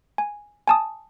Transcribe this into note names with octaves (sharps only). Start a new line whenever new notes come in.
G#5
G#5 A5 D#6